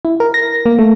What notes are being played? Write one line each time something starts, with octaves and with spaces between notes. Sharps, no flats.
E4
A#4
A#6
A#3
A3